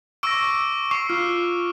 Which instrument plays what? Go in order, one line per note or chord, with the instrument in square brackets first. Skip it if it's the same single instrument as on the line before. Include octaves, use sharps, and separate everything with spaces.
[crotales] C#6 E6 D7 [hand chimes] D6 A#6
[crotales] C#6 D6 [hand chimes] C7 C#7
[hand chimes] F4 [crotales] F6